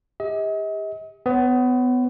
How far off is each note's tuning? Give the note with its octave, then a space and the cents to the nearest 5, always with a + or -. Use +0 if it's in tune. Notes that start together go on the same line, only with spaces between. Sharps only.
G4 +40 D#5 +40
B3 +25 C#5 +0